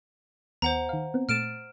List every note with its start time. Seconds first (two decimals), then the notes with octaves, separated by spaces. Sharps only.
0.62 D#2 B3 C5 F#5 A#5
0.89 D#3 F5
1.14 B3 C4
1.29 A#2 A3 F6 A6 D7 E7